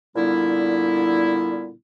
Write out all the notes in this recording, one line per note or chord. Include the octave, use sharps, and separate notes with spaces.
A#2 D3 G3 B3 E4